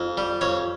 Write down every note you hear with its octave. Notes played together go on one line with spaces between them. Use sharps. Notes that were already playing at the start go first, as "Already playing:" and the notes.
Already playing: F2
G3
F2 C#5